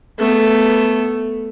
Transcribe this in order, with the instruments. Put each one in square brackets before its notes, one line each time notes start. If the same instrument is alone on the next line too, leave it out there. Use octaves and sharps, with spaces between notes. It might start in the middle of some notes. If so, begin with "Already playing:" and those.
[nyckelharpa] A3 B3